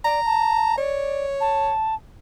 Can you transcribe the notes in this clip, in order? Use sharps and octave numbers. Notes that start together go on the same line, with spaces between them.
D5 A#5
A5
C#5 D5
A5